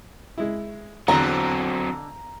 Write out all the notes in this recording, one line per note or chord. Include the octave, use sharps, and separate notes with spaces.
G#3 E4
E2 D3 F#3 C4 D#5 A#5